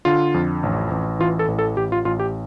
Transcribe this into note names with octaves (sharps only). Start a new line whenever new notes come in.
D3 F4
F2
A1
A1
E3 F4
A4
A1
A4
A1 G4
F4
A1 F4
G4